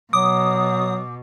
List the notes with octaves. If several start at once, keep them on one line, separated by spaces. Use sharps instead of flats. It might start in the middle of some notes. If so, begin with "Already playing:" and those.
B2 F#3 D6 D#6